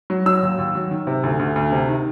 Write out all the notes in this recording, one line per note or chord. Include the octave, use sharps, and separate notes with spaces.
F#3
F#3 E6
D#2
D#2
F#3
D#3
C3
D2
D2
D2
C3
D#3